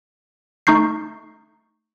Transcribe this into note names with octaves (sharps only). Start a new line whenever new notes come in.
A3 D#4 C#6 G6 C7